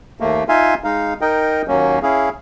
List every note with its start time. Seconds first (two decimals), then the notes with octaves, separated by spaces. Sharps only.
0.20 D#2 A3 A#3
0.49 D#4 F4 E5 F5 G#5 C6
0.84 G#3 D#4 F5
1.21 D#4 A#4 D#5 G5
1.68 D#2 F#3 A#3 C#4
2.03 C#4 E4 G#4 F5